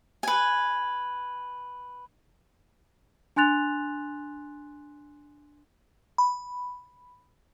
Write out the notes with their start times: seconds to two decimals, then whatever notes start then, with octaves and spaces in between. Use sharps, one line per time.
0.23 B4 G#5
3.36 D4 G#5 C6 F#6 A6 F7
6.18 B5